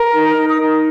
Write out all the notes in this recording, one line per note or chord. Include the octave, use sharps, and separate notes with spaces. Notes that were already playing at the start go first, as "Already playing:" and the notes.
Already playing: A#4
D#4
D#4
D#6
D#4